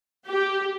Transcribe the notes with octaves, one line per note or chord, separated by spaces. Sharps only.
G4